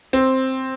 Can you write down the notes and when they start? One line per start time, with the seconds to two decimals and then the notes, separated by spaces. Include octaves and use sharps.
0.13 C4